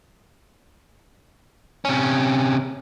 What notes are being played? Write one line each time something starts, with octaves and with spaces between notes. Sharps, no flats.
C3 C#4